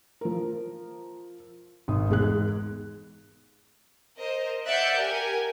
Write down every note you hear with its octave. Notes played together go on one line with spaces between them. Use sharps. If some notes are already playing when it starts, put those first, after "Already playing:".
F3 A#4
G#1 D#6
E2 G#2 G#4 F#6
A#4 C5 D#5
D5 E5 F#5 F#6 G6 C#7
G4 A#4 G#5